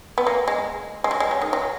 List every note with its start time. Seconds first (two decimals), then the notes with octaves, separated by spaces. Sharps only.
0.18 B3
0.27 A#3
0.48 G#3
1.04 G#3
1.11 F#3
1.20 G#3
1.31 F#3
1.42 D#3
1.53 F#3